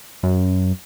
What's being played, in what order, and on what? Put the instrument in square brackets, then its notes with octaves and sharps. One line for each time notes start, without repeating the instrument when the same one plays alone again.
[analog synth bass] F#2